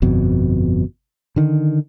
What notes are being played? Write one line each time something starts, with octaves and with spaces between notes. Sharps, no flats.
G1 F2 B2
D3 D#3